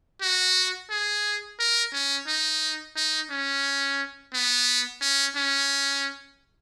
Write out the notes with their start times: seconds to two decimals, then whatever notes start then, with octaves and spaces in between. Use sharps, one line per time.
0.22 F#4
0.90 G#4
1.59 A#4
1.93 C#4
2.27 D#4
2.96 D#4
3.31 C#4
4.33 B3
5.02 C#4
5.36 C#4